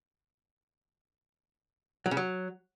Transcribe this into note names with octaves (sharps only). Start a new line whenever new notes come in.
F#3
C#3
F#3